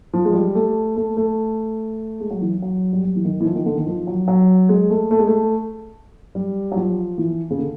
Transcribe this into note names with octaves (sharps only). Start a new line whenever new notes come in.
F3
G#3
G3
A3
A3
A3
G#3
F#3
E3
F#3
G3
F#3
E3
D#3
E3
F3
D#3
D3
D#3
F3
F#3
F#3
G#3
A3
A3
G#3
A3
G3
F#3
F3
E3
C#3
D3